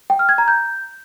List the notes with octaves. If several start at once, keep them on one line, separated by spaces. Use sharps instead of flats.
G5
F6
G#6
A#5
G6